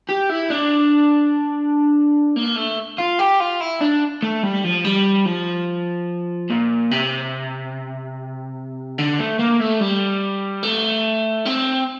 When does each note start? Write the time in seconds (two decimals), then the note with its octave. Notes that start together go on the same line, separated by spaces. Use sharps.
0.09 G4
0.29 E4
0.50 D4
2.36 A#3
2.56 A3
2.98 F4
3.19 G4
3.40 F4
3.60 E4
3.81 D4
4.23 A3
4.43 G3
4.64 F3
4.85 G3
5.26 F3
6.50 A#2
6.91 C3
8.98 D3
9.19 A3
9.39 A#3
9.60 A3
9.80 G3
10.63 A3
11.46 C4